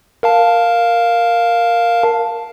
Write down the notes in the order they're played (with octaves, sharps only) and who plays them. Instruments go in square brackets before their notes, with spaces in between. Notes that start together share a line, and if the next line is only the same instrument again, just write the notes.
[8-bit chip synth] A#4 F5 A5